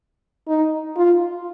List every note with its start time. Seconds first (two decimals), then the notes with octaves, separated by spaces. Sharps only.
0.48 D#4
0.96 F4